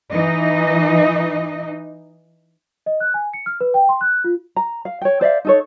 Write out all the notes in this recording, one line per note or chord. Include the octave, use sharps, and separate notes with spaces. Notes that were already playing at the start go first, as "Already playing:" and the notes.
E3 D#4 D#5
D#5
F#6
G#5
C#7
F6
B4
G5
C6
F#6
F4
A#5
F5
C#5 G5
C5 D5 E5 F5
D#4 A4 C#5